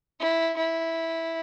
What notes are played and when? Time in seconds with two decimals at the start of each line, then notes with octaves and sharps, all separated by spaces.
0.20 E4
0.57 E4